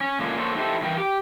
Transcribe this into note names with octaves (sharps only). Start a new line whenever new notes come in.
C#4
A#2 D3 G#3 A#3 C#4
D3 A#3 A4 C5 C#5
D#4 E4 G4 A4 A#4 C5
G2 E3 A#4 B4 G5
G4